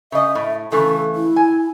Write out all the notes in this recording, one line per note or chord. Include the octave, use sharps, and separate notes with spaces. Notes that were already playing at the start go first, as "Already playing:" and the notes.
C#3 D#5 E5
A2
C#3 E3 A3 A4
E4
G#5